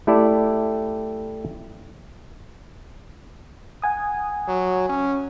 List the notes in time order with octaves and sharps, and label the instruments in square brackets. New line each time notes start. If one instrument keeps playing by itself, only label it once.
[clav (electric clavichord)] A3 E4 G4 A4 D5
[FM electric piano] F#5 G#5 D#6
[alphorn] F#3
C#4